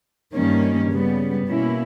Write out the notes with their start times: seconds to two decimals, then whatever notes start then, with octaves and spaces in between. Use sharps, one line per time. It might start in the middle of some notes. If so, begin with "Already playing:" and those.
0.34 G2 D#3 G3 A#3 C#4
0.92 C#3 G3 B3
1.49 B2 A#3 C#4 E4